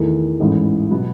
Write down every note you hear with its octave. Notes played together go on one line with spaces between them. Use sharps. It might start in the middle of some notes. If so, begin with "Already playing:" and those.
Already playing: E2 D#3 A3
A1 G#2 E3
B2 F#3 B3